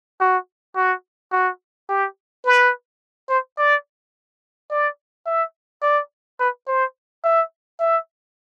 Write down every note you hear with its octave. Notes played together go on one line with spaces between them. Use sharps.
F#4
F#4
F#4
G4
B4
C5
D5
D5
E5
D5
B4
C5
E5
E5